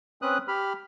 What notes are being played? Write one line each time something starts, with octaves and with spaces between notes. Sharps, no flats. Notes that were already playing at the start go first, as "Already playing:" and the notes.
C4 C#4 B4 D#6 F#6
G4 B5 F6